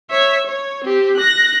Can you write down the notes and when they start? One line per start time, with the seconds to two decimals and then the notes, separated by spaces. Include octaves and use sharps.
0.10 C#5 E5
0.46 C#5
0.84 C4 G4
1.17 F#6 A#6